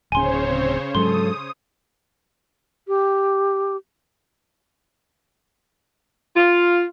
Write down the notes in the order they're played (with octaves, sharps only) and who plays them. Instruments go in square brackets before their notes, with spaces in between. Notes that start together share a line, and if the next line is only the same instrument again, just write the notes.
[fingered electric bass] D1 C#4 [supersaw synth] C#3 C5 C#5 [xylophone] G#5 C6
[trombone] C4
[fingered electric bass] G#2 F#3 G#3 [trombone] A4 [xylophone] C6 [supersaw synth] D#6
[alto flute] G4
[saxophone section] F4